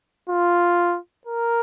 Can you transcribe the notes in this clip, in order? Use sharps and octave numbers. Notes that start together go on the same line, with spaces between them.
F4
A#4